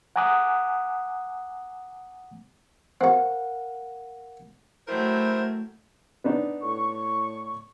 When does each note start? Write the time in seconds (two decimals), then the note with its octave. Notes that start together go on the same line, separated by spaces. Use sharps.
0.16 F#5 G#5 A#5 D6 D#6 F#6
3.01 C4 F#4 A#4 F5 F#5
4.88 F#3 A3 E4 A#4 C5 G5
6.24 B3 D4 D#4
6.62 A2 C#6